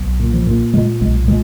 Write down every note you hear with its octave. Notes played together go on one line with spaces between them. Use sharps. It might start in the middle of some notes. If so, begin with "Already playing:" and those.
Already playing: B1
A#2
F3
A#2
A#2 G#3
B1 G#3
A#2 G#3